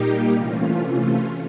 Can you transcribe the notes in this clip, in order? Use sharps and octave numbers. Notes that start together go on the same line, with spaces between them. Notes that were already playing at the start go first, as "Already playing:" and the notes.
Already playing: A#2 G3 A#3 D#4 G4
C3 E3 A3 C#4 F4